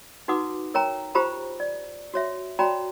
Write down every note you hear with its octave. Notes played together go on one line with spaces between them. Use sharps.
D#4 F#4 B4 F#5 D6 D#6
A#4 C#5 G5 A#5
F4 G4 C5 A#5 B5
D5
F#4 C#5 E5
F#4 C#5 D5 G5 A#5 B5